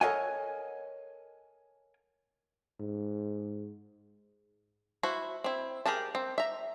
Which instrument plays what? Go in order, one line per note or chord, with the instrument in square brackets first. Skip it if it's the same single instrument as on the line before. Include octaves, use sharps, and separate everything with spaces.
[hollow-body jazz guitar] A4 A#4 C#5 D#5 F#5 G#5
[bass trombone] G#2
[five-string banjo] E4 F#4 C5
C4 E4
G4 G#4 A#4 G5 A5
C4
E5 A#5